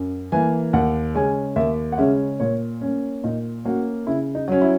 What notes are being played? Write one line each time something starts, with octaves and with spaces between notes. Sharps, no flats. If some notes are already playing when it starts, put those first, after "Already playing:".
Already playing: F#2
E3 A#3 G#5
D#2 F#5
C#3 G#3 C#4 G#5
D#2 E5
F#5
C#3 G#3 C#4 E5
A#2 C#5
A#3 C#4
A#2 D#4
A#3 C#4 F#4
C#3 E4
D#4
F#3 C#4
E4